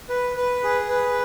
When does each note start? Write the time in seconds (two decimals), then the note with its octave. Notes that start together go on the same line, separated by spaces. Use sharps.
0.09 B4
0.37 B4
0.64 G#4
0.89 B4